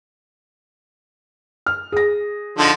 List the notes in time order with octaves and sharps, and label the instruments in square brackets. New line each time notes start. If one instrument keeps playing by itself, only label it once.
[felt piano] F6
G#4 A#6
[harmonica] D3 F3 D#4